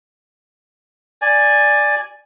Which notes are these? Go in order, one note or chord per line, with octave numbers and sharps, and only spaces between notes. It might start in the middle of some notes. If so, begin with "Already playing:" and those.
D5 G#5